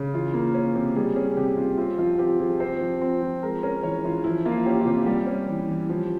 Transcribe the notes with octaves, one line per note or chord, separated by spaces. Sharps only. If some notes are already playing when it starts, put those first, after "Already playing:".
Already playing: C#3
E3 F4
A#3
C#4
C3
G3 G#4
C#4 G#4
C3 G4
C3 F4
C4 F4
F3 F4
C4 G4
F3 G#4
C4 C5
F3
C4
F3
G#3 A#4
C#4 A#4
E3 C#5
E3 F4
F3 E4
A#3 F4
C#4 G4
F4
C3 G4
G3 G4
C#4
E3
E3
F3